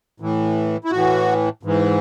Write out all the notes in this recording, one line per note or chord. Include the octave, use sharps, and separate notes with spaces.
A2 E3
E4
A2 E3 F#4
G#2 E3